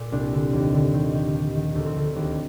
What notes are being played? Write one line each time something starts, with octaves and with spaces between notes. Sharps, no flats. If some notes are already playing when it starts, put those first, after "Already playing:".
Already playing: A#2
C2 D4
D3
D#2
D3
D#3
D#3
D#3
D#3
D2
C4
D2
D#2